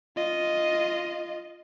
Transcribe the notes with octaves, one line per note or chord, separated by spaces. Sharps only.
F4 D#5